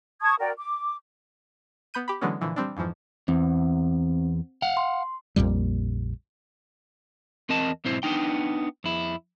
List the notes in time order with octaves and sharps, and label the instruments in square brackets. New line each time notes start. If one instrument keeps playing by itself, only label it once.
[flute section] A5 C#6 D#6 G#6
F#4 A#4 D5 G5
D6
[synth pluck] B3 B5 G6 D#7
G4 B5
D3 E3 F#3 G#3 B3 C#4
A#2 D3 E3 F3
G3 C4 D4
F2 G#2 E3 F3
[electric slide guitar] E2 [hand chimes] C4
[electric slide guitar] F5 F#5
[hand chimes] C6
[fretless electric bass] A#1 F2 A#2 G3
[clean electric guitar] E2 C4 A#4 D#5 A5
B1 G#2 C4 E4 C5
B3 D4 D#4 G5
F2 E4